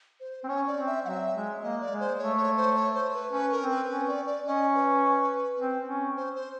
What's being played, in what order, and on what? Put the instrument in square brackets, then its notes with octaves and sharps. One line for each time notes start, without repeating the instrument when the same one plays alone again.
[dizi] C5
[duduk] C4
[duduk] C#4 [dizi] C#5
[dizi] D5
[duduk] C4
[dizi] E5
[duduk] F#3 [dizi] E5 F#5
[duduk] G#3
[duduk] A#3 [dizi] D#5
[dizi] D5
[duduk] G#3
[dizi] C5
[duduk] A3 [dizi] C#5
[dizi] C#5
C5
C#5
C5
B4
[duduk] C#4 [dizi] B4
[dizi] A#4
[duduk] C4
[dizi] B4
[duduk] C#4 [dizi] B4
[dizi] D5
D5
[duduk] C#4 [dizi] D#5
[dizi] B4
[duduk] C4
C#4
[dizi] C5
C5